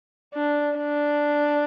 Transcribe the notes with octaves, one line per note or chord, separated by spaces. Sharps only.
D4
D4